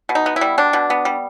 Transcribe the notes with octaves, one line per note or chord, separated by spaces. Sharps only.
B2
D#4
B3
E4
G3
B2 D4
B2
B3
G3